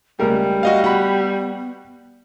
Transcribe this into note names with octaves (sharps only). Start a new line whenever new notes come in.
C#2 G3 A3 A#3 A#4
F#4 D#5 F5
B3 F#4 F#5 B5